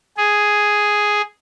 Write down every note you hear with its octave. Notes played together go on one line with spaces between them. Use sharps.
G#4